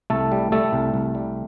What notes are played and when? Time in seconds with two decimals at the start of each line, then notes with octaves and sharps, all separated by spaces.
0.10 C2 A3 A4
0.32 G3
0.52 G3 A3 A4
0.73 C2
0.94 C2
1.15 G3